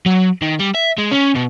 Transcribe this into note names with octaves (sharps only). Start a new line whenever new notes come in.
F#3
D#3
G3
E5
G#3
C#4
B2